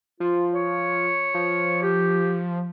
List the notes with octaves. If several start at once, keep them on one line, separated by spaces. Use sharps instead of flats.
F3 F4
C#5
F3
G4